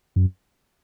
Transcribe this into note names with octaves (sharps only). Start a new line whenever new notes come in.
F#2